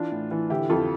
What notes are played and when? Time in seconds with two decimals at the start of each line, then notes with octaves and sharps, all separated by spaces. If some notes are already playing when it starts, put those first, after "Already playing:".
Already playing: E3 D4 F4
0.12 A2
0.31 E3
0.50 D3 E4 G4
0.69 F2 F4 A4